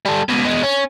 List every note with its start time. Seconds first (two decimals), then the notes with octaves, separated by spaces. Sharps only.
0.05 G3 A4
0.29 C#2 B2
0.45 B2 G#3
0.63 C#4